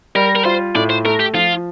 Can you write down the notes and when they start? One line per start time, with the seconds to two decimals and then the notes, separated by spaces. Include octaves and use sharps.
0.15 G3 A#4
0.35 A#4
0.45 F4 C5
0.75 A2 D5
0.90 C5
1.05 A3 A#4
1.20 G4
1.34 F3 F4